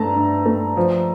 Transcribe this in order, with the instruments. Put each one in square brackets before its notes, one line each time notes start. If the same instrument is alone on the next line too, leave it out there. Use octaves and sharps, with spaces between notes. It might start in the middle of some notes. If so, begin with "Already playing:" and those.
Already playing: [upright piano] G2 A3 A5 A#5
G2
A3
F3